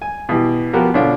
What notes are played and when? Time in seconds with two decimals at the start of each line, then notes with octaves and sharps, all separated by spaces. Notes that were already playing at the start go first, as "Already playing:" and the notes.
0.02 G#5
0.29 B2 E3 G4
0.73 F3 B3 F#4 G4 A#4
0.94 B2 D3 C#4 D4 F4